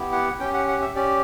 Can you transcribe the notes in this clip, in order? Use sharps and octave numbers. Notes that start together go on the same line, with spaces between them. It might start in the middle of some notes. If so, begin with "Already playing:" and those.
Already playing: B3 E4 G4
F#5
C#4 G4 G5
F#5
F#5
E5
C#4 G4 D5